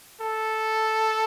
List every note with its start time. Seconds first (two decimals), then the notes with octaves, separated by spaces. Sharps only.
0.21 A4